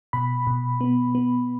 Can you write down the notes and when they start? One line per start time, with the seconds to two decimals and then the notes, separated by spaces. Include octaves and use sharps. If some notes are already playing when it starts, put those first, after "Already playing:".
0.13 B2 B5
0.47 B2
0.81 B3
1.15 B3